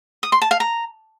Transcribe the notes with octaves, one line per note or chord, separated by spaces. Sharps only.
D#6
C6
A5
F5
A#5